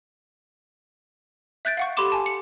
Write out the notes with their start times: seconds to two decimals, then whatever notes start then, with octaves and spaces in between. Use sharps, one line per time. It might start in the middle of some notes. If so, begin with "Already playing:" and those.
1.65 E5 F#6 G6 A6 D7
1.77 F5 F#5 C#6
1.97 G4 A4 B5 C6 D6 E7
2.12 G#5 A5
2.26 C#7